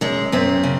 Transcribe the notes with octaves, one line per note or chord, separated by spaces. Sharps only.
F#2 G#3
F#2 C4
C#3